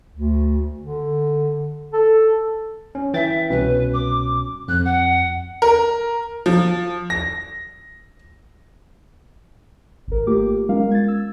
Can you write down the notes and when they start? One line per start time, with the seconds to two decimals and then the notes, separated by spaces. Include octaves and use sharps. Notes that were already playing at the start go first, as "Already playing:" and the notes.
0.13 D2
0.80 D3
1.93 A4
2.95 C#4
3.14 E3 E5 G5 A6
3.50 C2 B2 C#4 B4
3.93 D6
4.68 F2 F#6
4.84 F#5
5.62 A#4
6.46 F3
7.10 A#6
10.08 G#1 A#4
10.27 A3 A#3 F4 G4 D6
10.69 G#3 B3 C#4 F4 A#4 F5
10.91 G#6 A6
11.08 E6